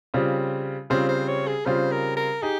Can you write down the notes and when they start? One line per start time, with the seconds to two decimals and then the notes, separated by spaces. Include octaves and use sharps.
0.14 C#3 G3 C4 F4
0.90 C#3 G3 C4 F4 C5
1.09 C5
1.28 C#5
1.47 G#4
1.66 C#3 G3 C4 F4 C5
1.92 A#4
2.17 A#4
2.42 D#4 G4 G#4